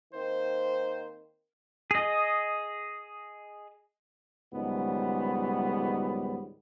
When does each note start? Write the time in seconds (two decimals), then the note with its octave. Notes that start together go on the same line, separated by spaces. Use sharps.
0.13 D#3 A#3 C4 C5
1.91 G#4 D#5
4.53 C#2 G#2 D#3 F#3 G3 B3